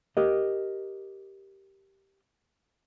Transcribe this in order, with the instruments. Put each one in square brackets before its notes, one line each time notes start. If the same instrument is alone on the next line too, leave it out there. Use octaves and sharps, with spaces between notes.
[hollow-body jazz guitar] G4 A#4 D#5